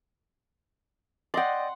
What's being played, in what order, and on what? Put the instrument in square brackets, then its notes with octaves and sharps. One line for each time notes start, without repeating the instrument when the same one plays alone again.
[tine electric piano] D5 D#5 G5 [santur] F#5 C6